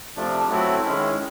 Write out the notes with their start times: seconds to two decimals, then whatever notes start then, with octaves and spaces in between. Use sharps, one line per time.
0.16 C3 F3 A3 D4
0.49 F#3 A3 C4 E4
0.83 D#3 G#3 C#4 E4